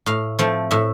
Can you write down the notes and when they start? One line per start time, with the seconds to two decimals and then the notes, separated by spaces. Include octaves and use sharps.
0.06 A2 F5
0.39 F3 A3 C4
0.71 A2 E5